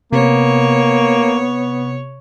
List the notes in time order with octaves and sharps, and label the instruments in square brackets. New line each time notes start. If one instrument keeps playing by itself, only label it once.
[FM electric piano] C3 [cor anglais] A#3 [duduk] B3 [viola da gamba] C#5